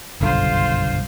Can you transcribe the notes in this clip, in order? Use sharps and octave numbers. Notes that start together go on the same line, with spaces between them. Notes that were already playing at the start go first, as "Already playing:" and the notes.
F#1 B1 G2 D3 F4 C5